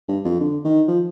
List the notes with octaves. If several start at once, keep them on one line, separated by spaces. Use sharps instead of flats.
G2
F2
D3
D#3
F3